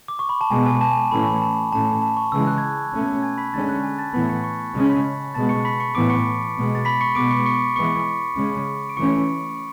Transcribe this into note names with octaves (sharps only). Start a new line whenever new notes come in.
D6
C#6
B5
A5
B2 G#3 B3 G#5
G#5
A5
G#5
A2 E3 A3 C#4 B5
B5
A5
A2 E3 A3 C#4 A5
A5
C#6
C#3 E3 G#3 E6
F#6
G#6
F#6
B2 A3 C#4
G#5 G#6
B5 B6
D3 G#3 C#4 A5 A6
F#6
G#5 G#6
A5 A6
A2 E3 B3 B5 B6
C#6 C#7
C#6 C#7
C#3 G#3 C#4
B5 B6
B2 G#3 B3 A5 A6
C#6 C#7
B5 B6
C#6 C#7
A2 E3 B3 D6 D7
C#6 C#7
B2 G#3 B3
A6
B5 B6
C#6 C#7
B2 G#3 B3 D6 D7
C#6 C#7
C#6 C#7
E3 G#3 B3 C#6 C#7
C#3 G#3 C#4
D7
E3 A3 C#4 C#6 C#7